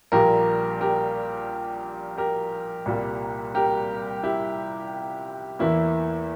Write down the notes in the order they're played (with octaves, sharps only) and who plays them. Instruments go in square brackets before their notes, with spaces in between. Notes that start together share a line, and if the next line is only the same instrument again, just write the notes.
[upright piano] A#1 A#2 G3 A#3 G4 A#4
G4 A#4
G4 A#4
C2 A#2 G3 A#3
G4 A#4
E4 G4
E2 E3 A#3 E4